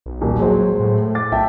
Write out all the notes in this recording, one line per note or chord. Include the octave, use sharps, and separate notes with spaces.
B1
D#1
F#3 G#3 C5
A2
D6 A6
B1 E5 G5 A5